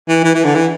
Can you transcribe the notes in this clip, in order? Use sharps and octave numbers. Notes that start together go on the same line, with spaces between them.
E3
E3
E3
D3
E3